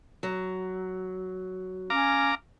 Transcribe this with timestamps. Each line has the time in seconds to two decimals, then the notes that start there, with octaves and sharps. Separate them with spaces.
0.23 F#3
1.90 C#4 F5 A#5 D6